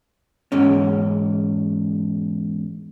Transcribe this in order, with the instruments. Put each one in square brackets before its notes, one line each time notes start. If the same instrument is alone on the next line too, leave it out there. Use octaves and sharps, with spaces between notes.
[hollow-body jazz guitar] E2 G#2 C#4